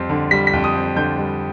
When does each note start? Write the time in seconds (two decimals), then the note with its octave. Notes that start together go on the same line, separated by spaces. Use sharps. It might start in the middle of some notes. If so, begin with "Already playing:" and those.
Already playing: F2 G3 C4
0.10 D3
0.31 G3 B6
0.47 B6
0.53 F2
0.64 D#6
0.75 C4
0.96 D3 G6
1.18 G3